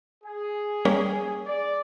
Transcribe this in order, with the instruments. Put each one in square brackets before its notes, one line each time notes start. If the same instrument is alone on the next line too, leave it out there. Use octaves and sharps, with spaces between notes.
[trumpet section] G#4
[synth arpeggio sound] G3 A#3 C#4
[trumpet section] D5